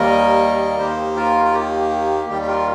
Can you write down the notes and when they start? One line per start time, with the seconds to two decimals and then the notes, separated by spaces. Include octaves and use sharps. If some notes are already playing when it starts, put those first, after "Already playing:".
Already playing: D#2 D#3 G3 A#3 A#4 D#5
0.79 D#2 D#3 A#3 G4 C5
1.16 F4 A#4
1.45 A#4
1.54 G4
2.28 D#2 D#3 G3 G4
2.42 G4
2.47 F4 A#4